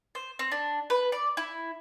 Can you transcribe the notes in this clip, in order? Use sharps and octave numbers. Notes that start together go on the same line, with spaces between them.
C5
C4
D4
B4
D5
E4